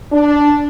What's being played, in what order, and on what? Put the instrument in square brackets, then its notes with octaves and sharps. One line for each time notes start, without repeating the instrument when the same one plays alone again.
[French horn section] D4